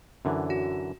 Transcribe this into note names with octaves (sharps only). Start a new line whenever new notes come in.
F#2 D3 E3
F#4